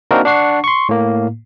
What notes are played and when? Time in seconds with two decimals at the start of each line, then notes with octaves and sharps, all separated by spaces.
0.11 A#3 C4 D4 D#4 F#4 A#4
0.25 D4 F#5 C#6 C7
0.64 C6 C#6
0.89 A2 A#3